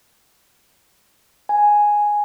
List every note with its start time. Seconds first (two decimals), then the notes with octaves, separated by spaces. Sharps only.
1.49 G#5